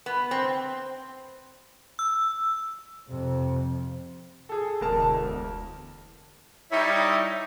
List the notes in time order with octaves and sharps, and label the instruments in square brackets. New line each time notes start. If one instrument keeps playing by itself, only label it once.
[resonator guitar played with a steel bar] B3
C4
[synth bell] E6
[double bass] F2 C3
[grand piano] G#4 A4
[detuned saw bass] E1 [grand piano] D2 A#4 A5
[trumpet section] G3 D#4 [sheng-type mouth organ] E4 C#5 E5